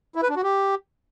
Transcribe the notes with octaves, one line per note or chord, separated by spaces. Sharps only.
E4
B4
D4
F#4
G4